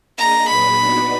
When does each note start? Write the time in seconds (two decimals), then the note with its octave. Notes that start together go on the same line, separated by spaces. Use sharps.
0.18 A#3 D4 G#4 D#5 A#5
0.49 A#2 F#3 D4 G#4 B4 B5
0.81 B3 D#4 F#4 B4 D5